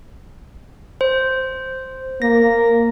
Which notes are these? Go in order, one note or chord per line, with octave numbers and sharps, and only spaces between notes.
C5
A#3 A#6